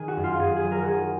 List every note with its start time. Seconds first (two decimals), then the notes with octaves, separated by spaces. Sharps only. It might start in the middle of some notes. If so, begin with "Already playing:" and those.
Already playing: D#3 G#4
0.08 F#4
0.16 F#2
0.24 F4
0.39 F#2 G#4
0.56 G#4
0.64 F#3
0.72 A#4
0.82 F#4
0.87 D#3 G#4